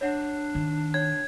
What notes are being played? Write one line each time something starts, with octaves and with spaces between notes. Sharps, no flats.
D4 C#5 E5 F#5
D#3
C#5 G5 G#6